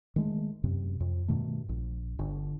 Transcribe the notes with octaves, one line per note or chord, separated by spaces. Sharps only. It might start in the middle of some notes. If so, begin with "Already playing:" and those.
D#3 G#3 A3
F#2 C3
F2
G2 B2 D#3 A3
A#1
G1 D3